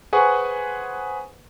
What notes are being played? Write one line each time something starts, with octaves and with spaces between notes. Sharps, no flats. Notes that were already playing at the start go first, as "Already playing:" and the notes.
G#4 B4 C5 F#5 G#5 C#6